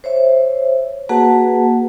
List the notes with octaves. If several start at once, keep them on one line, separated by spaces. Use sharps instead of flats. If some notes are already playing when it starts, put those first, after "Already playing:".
C5 C#5 E5
A#3 F#4 G#4 B4 F#5 A5